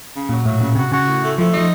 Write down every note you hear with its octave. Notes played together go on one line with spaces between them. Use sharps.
C#3
A#2 F#3
A2 F#3
A#2 C#3
C3 F#4
C#3 F#4
A2
A3
F3 A3
F3 D#4